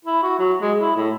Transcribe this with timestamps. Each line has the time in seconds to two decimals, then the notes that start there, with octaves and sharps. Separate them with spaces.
0.05 E4
0.23 F#4
0.39 F#3
0.61 G#3
0.79 E4
0.96 A2